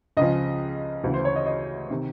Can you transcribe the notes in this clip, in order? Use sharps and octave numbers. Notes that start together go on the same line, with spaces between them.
C#2 C#3 F3 D#5
D2 C#3 E3
C5
C#5
D#5
D#5
C3 D#3